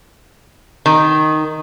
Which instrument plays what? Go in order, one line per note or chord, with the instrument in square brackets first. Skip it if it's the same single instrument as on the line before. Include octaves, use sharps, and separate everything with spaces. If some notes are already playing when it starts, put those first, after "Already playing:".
[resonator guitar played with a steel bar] D#3